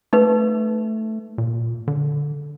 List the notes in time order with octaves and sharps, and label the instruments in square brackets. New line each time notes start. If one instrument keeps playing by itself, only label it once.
[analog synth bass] A3 [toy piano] D#4 B4
[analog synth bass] A#2
D3